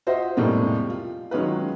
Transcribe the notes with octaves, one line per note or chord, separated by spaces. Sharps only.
F4 F#4 C5 D#5 E5
F2 A2 C3 G3 G#3 A#3
F4
D#3 F#3 G#3 C#4 F4 B4